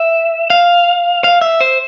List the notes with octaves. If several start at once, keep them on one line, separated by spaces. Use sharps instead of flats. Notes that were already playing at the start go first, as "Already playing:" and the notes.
Already playing: E5
F5
F5
E5
C5